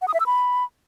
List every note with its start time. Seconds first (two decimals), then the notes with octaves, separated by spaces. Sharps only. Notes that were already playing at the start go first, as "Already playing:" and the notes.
0.02 F#5
0.08 D#6
0.14 E5
0.20 E6
0.26 B5